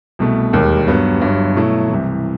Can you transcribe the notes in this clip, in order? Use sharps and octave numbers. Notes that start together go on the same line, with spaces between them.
C2 B2 A3
E1 D#2 D#3 G3
G2 F#3 B3
G1 G2 F#3
B2 F#3 A3 E4
C2 C3 E3